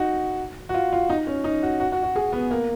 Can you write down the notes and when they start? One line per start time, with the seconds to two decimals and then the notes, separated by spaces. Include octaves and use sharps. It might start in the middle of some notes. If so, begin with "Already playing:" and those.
Already playing: D#4 F#4
0.69 F#4
0.74 F4
0.92 F4
1.10 D#4
1.27 C#4
1.44 D#4
1.63 F#4
1.80 F#4
1.92 F#4
2.03 F#4
2.16 G#4
2.32 B3
2.51 A#3